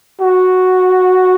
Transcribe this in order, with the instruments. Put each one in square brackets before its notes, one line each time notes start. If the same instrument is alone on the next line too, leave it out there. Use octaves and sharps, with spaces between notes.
[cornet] F#4